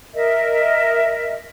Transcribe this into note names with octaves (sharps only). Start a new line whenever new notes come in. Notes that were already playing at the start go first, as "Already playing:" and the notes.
A#4 D#5 E5